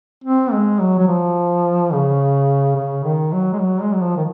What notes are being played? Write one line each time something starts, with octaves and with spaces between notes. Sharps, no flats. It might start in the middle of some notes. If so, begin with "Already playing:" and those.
C4
G#3
F#3
F#3
F3
C#3
C#3
D#3
F#3
G#3
F#3
G#3
F#3
F3
D#3